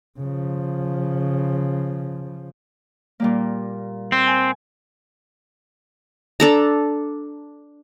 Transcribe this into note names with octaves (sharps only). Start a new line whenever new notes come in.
C#3 F3
A#2 G3 A#3
C4
G#5
D4 A4 A#5